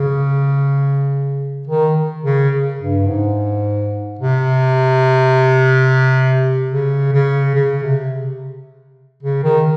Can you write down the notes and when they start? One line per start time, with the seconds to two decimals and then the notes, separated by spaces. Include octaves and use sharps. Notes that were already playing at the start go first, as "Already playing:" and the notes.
Already playing: C#3
1.67 D#3
2.23 C#3
2.79 G2
3.07 G#2
4.19 C3
6.70 C#3
7.13 C#3
7.55 C#3
7.83 C3
9.23 C#3
9.43 D#3